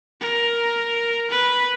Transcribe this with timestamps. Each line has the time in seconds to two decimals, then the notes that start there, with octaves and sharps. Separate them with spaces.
0.21 A#4
1.30 B4